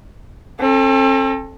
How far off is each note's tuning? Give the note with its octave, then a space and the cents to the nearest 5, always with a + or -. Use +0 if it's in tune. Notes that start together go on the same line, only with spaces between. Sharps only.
C4 +45 A4 +0